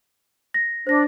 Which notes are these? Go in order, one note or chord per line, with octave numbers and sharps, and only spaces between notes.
A#6
D4 C5 A#6